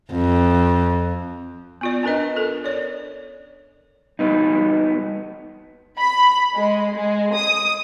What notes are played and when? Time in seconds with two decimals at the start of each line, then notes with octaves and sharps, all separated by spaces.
0.11 F2
1.81 B3 F4 D5
2.03 C#4 D4 A#4 B4 D#5
2.36 A4 A#4
2.64 C#5 D5
4.19 G3 B3 D#4
5.99 B5
6.54 G#3
6.95 G#3
7.34 D#6